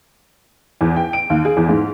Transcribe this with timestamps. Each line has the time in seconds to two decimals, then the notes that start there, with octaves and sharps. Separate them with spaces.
0.81 E2
0.96 G5
1.13 D7
1.30 D#2
1.45 G#4
1.57 E2
1.69 G#2